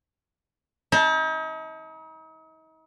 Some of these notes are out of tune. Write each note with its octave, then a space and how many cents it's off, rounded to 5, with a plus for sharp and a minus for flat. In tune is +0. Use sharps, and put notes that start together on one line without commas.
D#4 +40 A5 +0